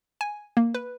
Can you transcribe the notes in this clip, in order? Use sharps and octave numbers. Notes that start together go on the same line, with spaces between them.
G#5
A#3
B4